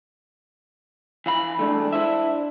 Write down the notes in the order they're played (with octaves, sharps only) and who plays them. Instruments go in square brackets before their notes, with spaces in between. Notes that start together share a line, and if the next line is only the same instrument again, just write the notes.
[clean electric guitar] E3 F5 B5
[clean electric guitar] E3 G#3 A3 [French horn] D4
[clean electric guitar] E4 C5 E5